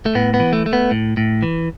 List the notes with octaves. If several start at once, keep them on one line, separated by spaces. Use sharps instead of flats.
A3
A2 B3
B3
E3
A3
A3
B3
A2
A2
E3